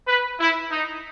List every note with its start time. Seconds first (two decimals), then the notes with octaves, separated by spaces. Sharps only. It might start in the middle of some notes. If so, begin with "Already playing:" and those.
0.08 B4
0.40 E4
0.71 D#4